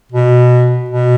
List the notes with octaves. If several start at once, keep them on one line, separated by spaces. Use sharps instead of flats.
B2
B2